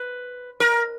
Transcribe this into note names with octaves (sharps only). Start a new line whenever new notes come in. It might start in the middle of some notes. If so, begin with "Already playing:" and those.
Already playing: B4
A#4